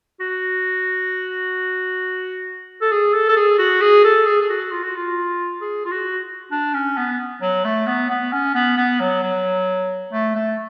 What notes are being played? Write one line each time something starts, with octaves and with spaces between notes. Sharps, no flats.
F#4
A4
G#4
A4
A4
G#4
F#4
G#4
A4
G#4
G#4
F#4
F4
F#4
F4
G#4
F4
F#4
D4
C#4
B3
F#3
A3
B3
B3
C#4
B3
B3
F#3
F#3
A3
A3